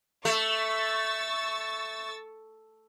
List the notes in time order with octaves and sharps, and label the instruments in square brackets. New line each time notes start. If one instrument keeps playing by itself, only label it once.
[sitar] A3 [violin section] C#6 E6 A6